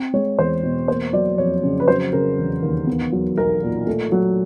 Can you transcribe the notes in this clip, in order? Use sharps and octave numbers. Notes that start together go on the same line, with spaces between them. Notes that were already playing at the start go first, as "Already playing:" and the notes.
Already playing: C4
G#3 C#5
E2 C5
B2
A#3 C5
F#3 D5
F2 C#5
C#3
B4
F#3 C5
C#3 A#4
E1
D#2
B3
F#3
B1 A#4
A#2
A3
F#3